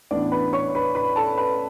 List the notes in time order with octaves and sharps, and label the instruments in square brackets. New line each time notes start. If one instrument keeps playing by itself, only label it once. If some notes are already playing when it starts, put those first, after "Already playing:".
[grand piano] A1 A2 E3 B3 D4 D5
B4 B5
C#5 C#6
B4 B5
B4 B5
A4 A5
B4 B5